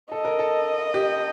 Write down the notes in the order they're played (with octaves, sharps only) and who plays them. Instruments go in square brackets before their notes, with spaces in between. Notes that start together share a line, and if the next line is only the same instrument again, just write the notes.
[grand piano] A4 [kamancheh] D#5
[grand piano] A#4
A4
G4